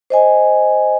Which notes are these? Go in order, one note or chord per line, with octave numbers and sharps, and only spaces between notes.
C5 D#5 G#5